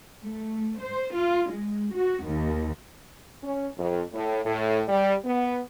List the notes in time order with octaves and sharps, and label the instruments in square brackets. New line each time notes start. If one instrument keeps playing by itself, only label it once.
[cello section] A3
C5
F4
G#3
F#4
D#2
[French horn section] C#4
F2
A2
A2
G3
B3